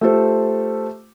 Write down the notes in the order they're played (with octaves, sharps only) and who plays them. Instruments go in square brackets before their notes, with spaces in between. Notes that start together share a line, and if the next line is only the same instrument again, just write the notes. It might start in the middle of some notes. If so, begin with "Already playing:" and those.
[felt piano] A3 F4 G4 A4 C5